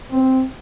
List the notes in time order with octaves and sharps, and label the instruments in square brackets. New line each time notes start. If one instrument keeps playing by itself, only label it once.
[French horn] C4